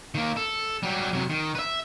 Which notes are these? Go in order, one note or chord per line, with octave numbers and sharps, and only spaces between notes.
D#3 A#3
A4
F#3 G3
C3 F#3
D#3
B4 E5